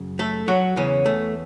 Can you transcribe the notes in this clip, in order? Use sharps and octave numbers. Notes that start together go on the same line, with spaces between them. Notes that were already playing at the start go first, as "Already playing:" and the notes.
Already playing: F#2 C#3
A3 A4
F#3 F#4
E2 C#3 E3 C#4
A3